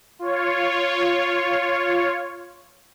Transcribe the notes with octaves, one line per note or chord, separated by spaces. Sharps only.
F4 C#5